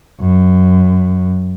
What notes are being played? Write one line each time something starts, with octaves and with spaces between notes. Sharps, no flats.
F#2